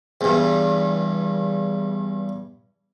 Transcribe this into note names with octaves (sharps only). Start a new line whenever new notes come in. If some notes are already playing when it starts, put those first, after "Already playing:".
E2 G2